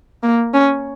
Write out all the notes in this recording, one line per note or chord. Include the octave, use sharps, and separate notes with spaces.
A#3
C#4